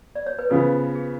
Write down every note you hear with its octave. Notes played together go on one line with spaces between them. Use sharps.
D5
C#5
B4
C#3 F3 B3 A4
G#4